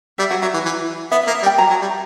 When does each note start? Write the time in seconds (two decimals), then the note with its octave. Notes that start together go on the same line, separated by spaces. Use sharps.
0.18 G3 E5
0.30 F#3 F#5
0.42 F#3 E5
0.54 E3
0.65 E3
1.11 B3 E5
1.23 E5
1.27 A#3
1.35 E5
1.43 G3
1.46 G5
1.58 F#3 A#5
1.70 F#3
1.81 G3